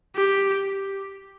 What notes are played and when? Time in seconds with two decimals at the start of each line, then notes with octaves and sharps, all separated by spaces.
0.16 G4